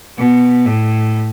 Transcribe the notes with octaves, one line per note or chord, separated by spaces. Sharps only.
B2
A2